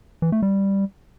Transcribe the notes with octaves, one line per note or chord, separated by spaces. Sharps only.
E3
A3
G3